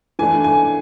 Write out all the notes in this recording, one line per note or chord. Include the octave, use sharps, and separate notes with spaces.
E3 A3 D4 G#5
G#5